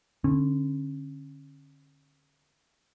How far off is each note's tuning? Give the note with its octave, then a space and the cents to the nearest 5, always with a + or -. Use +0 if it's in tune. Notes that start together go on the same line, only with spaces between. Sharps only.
D3 +0 C#4 -35